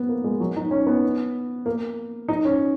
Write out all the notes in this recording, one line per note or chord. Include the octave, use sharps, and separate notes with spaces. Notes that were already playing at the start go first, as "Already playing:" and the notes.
Already playing: B3
A#3
G#3
F#3
D#4
C#4
B3
A#3
D#4
C#4